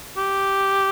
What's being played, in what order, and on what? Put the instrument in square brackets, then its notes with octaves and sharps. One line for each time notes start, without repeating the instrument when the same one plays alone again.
[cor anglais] G4